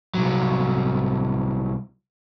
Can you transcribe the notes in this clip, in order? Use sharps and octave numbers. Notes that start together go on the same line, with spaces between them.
C2 F#3